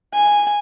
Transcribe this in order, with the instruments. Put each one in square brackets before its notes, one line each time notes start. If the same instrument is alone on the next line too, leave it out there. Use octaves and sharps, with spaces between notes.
[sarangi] G#5